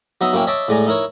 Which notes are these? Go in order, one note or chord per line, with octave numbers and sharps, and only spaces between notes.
F#3 B3 D#4 D#5 E5
F#2 A#3 C#4 E4 G5
C#5 D#5 E5 A5 B5 D6
A2 G#3 D5 G#5 A#5
D#4 E4 A#4 C#5